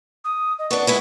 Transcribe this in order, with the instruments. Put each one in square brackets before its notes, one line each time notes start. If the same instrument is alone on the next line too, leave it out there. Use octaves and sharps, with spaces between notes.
[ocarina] D#6
D#5
[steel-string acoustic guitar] B3 D4 [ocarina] C#6
[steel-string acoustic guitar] G#3 B3 E4